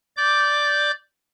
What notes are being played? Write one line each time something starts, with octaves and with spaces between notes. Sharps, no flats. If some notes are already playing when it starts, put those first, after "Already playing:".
D5 D6 G6